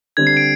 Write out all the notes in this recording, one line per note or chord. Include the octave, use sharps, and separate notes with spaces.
D3 G3 C4 G#6
C7
D7